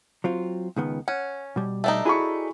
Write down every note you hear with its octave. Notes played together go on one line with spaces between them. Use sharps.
F#3 C4 F4
C#2 D#3 B3
C#4 F#5
B2 G3
A3 D4 D#4
E4 F#4 G#4 A4 B5 C#6